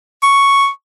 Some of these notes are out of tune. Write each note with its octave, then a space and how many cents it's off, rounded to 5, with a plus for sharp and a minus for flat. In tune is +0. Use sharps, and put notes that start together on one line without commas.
C#6 +0